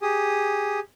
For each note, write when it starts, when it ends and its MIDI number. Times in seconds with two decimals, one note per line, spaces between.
0.02 0.79 67
0.02 0.79 68
0.02 0.79 87